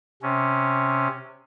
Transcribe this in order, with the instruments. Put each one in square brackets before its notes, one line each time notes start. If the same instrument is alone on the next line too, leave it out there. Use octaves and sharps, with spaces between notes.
[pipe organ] C3 C#4